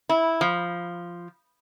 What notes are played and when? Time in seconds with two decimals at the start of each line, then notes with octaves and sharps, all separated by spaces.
0.09 E4
0.41 F3